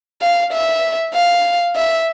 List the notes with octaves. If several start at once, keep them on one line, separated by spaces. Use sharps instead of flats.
F5
E5
F5
E5